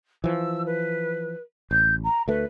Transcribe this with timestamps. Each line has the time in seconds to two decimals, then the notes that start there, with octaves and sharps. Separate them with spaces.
0.24 E3 F3 E6
0.66 B4
1.71 A1 G6
2.04 A#5
2.28 D2 A3 B4